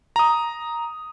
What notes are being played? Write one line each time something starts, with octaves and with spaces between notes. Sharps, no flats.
A#5 D#6